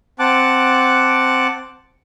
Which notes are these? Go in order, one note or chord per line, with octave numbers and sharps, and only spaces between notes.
C4 F#5 A5 D6 F#6